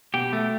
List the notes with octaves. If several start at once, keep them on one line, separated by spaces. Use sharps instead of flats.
B2 G4
A3